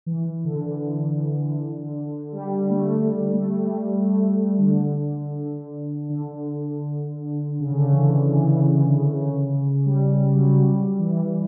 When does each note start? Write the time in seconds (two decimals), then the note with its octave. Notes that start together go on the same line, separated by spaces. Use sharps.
0.06 E3
0.45 D3
2.32 G3
2.70 A3
2.97 A3
3.08 G3
3.33 A3
3.58 G3
4.59 D3
5.34 D3
6.09 D3
7.60 C#3
7.72 D3
7.83 C#3
7.92 E3
7.98 D3
8.35 E3
9.11 C#3
9.86 G3
10.24 G3
10.33 F#3
10.43 G3
10.62 G3
10.99 E3